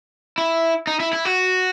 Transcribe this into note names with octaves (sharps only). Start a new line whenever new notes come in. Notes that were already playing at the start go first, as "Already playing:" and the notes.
E4
D#4
E4
E4
F#4